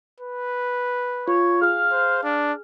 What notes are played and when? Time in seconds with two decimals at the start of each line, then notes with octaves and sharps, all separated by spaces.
0.20 B4
1.28 F4 C#5
1.62 G#4 F5 F6
1.92 C5
2.24 D4